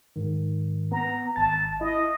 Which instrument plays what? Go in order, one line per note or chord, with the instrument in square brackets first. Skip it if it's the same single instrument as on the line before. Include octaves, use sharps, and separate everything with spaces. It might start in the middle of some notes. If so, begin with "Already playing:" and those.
[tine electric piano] G#2 D#3
[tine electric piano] B3 [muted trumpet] A#5
[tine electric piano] G#1 A6 [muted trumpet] A5
[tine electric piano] E4 [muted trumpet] D#5